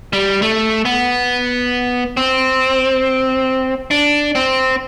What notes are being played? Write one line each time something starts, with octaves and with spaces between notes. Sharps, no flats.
G3
A3
B3
C4
D4
C4